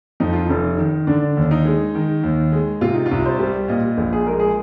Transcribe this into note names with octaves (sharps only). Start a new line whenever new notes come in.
F2 D#4
F4
F1 D#4
D#3
D3 D4
D#2
D#4
G#3
D#3
D#2
G#3
C3 F4
D#4
F4
C2
C5
G3
A#2 D#5
A#1
G#4
G#3 A#4
G#4